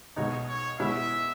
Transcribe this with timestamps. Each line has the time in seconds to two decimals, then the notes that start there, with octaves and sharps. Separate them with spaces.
0.16 B1 B2 G#3 D#4 C#5
0.48 C#5
0.79 B2 G#3 C#4 E4 E5